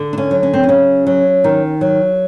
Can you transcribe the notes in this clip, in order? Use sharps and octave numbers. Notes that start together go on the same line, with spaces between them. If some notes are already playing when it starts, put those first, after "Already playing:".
Already playing: D3
D4
C#4
F#3
C#4
C4
C#4
C#3
F#3
D#3
F#3